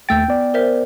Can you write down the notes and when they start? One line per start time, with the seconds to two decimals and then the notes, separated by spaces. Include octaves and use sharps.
0.09 D#2 A3 G5 E6 G6 A6
0.28 B3 D5
0.54 A#4 C5 E5